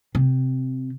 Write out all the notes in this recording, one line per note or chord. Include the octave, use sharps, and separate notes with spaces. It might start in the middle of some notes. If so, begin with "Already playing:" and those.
C3